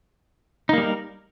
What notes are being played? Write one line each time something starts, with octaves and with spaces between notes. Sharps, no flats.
G3 A#3 D#4 A#4